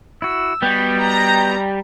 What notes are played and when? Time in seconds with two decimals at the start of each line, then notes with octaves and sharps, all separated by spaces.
0.22 E4 F#4 E6
0.63 G3 B3 F#4 B4 D#5 G5
1.05 A#5